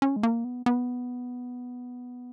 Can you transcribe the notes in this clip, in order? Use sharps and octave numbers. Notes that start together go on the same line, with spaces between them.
C#4
G#3
A#3
B3
B3